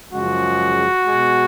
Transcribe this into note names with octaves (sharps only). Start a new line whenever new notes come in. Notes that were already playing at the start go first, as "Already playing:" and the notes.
F#2 C#3 F3 G#3 F#4
B2 G#3